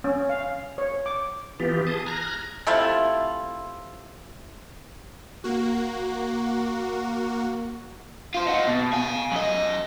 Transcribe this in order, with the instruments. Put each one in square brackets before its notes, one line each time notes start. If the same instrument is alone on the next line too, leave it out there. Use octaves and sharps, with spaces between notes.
[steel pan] C#4
F5
C#5
D6
[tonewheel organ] E3 B3 F4 G4
G#4 A5 D#6
A#5 F6 F#6 G#6 A#6
[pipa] C3 A3 E4 F4
[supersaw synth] A#3 F#4
[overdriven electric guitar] F4 C5
D#4 F#4
B2
F5 G#5
F#2 D#5